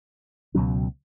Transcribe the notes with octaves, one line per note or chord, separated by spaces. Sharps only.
C#2 B2 F#3 C#4